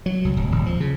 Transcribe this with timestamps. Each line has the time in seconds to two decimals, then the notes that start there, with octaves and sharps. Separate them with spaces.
0.06 F#3
0.25 C2
0.37 D1
0.51 D1
0.66 F3
0.80 C#3